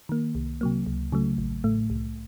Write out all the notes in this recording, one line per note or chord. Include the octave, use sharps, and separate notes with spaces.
D#3 A#3
C2
C3 F#3 A#3
C#2
C#3 F#3 A3
A1
A2 A3
C2